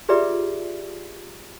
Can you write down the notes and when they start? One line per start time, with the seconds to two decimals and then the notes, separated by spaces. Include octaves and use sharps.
0.09 F4 G4 G#4 B4 D5 E5